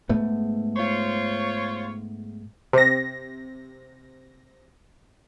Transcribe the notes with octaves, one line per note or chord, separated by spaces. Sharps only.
G#2 A3 B3
F4 C5 C#5
C3 A#6